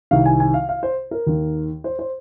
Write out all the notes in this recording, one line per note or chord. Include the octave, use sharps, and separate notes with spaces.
C2 C3 D#3 F5
G#5
G#5
F5
F5
C5
A#4
D#2 D#3
C5
C5